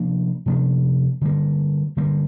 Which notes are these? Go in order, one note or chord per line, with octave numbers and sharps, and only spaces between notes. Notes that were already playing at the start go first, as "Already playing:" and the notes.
Already playing: C3 F3 A#3 D4
C3 F3 A#3 D4
D3 G3 A#3
D3 G3 A#3